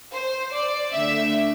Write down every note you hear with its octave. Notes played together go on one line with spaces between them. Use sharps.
C5
D5
D3 A3 E5